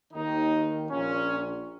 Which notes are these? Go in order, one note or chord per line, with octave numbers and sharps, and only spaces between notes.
D#2 D#3 D#4
A#1 A#2 C#4